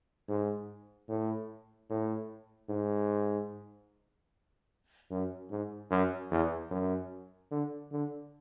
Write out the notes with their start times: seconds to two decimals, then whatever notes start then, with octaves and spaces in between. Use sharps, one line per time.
0.29 G#2
1.09 A2
1.90 A2
2.69 G#2
5.11 F#2
5.50 G#2
5.90 F#2
6.31 E2
6.71 F#2
7.51 D3
7.91 D3